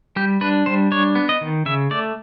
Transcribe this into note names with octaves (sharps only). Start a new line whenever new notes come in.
G3 G4
D4 B4
G3 C5
D4 C#5
B3
D#5
D#3
C#3 E5
A3 D5